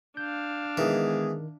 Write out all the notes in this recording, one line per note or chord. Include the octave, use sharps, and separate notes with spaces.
D4 F5 G6
D#3 E3 G#3 B3 G#4